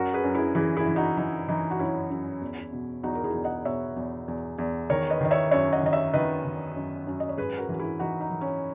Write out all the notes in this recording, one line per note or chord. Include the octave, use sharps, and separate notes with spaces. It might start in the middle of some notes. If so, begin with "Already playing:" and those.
Already playing: F#2 F#4 A#4
G#4 B4
F#2
E4 G#4
E3 E4 G#4
E4 G#4
E3
D#4 F#4
E3 D#4
E3 D#4
F#4
F#2 C#4 E4
F#2
E2
B2
E2 D#4 F#4
A#4
E4 G#4
E2
D#5 F#5
B2 C#5 E5
E2
E2
E2
D#3 A#4 C#5
B4 D#5
D#3 D#5
C#5 E5
F#2 C#5 E5
D#5 F#5
D#3 D#5
C#5 E5
D#3 B4 D#5
D#3
F#2
F#2
D#5
C#5
G#2 G#4 B4
F#4 A#4
E3
F#4
E4 G#4
E3 D#4 F#4
D#4
E3
C#4